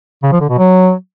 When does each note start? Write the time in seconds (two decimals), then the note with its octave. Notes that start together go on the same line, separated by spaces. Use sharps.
0.23 C#3
0.32 F3
0.41 D3
0.50 B2
0.58 F#3